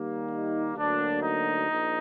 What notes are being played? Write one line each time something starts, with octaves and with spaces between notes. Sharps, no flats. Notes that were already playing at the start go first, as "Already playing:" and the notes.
Already playing: D#2 D#3 G3 A#3
D#4
D2 D3 F#3 A#3 D4
D#4
A#1